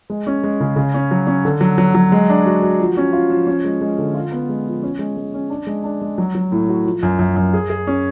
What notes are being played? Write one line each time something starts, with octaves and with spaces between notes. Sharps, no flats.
G#3
C#4
G#3
C#3
C#3
C#4
F#3
C#4
D3
F#3
F#3
F#3
G#3
D4
F#4
F#4
F3
C#4
F4
F3
C#4
G#3
G#3
D3
F4
B3
G#3
F3
C#4
G#3
G#3
C#4
D4
G#3
D4
G#3
F#3
F#3
A2
F#4
F3
F#2
F#2
F#2
G#4
G#4
C#4